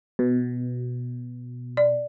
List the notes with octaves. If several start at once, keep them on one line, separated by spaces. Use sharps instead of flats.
B2
D5